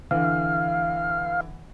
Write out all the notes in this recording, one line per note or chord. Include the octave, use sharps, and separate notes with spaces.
D3 E3 F5